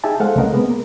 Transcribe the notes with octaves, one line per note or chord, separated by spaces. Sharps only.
D#4 G4 G#4 E5 G#5 A5
G#3 A4 C5 F5 F#5
C2 A3 C#4 A#4 D#5 F#5
C3 G#3 A#3 B3
A#4